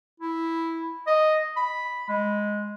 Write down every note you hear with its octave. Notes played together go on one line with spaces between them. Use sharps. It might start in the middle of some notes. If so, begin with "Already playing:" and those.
E4
D#5
B5
G#3